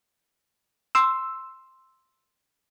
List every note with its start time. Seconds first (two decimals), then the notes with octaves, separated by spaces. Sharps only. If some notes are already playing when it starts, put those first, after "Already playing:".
0.95 C6 E6